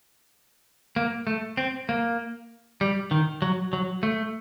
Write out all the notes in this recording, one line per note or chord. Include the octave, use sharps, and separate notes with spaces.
A#3
A3
C4
A#3
G3
D#3
F#3
F#3
A3